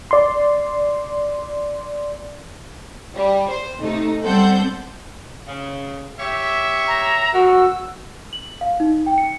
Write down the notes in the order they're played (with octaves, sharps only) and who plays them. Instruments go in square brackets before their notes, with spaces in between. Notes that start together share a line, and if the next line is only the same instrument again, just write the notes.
[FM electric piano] D5 C6
[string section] G3
C5
C3 A3 D#4
G3 C4 A4 C5 F#5 G6
[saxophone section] C#3
[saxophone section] G4 C#5 [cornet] E5
[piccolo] A#5
[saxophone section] F#2 [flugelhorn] F#4 [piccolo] E6
[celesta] F#7
F5
D#4
G5
C#7